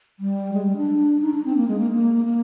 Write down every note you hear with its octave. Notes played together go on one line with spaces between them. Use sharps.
G3
G#3
G3
D4
D#4
D4
C4
A#3
G#3
A#3
A#3
A#3